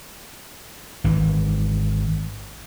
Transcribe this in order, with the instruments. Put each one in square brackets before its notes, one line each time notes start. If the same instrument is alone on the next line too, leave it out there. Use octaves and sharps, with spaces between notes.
[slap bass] G#1 E3